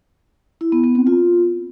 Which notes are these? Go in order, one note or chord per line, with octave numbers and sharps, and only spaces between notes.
E4
B3
B3
C4
F4